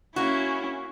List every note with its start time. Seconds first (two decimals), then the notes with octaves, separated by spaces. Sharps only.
0.16 A#3 C#4 E4 F#4